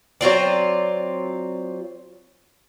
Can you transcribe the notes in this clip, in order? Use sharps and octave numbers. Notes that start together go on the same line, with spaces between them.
F#3 C4 F4 D5